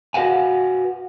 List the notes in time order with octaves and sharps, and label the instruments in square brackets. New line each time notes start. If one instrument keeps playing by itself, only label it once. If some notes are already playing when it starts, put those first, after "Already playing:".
[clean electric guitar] F#4 G4 B4 F5 F#5 G#5